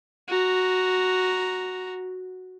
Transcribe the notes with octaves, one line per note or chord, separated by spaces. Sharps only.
F#4 A#5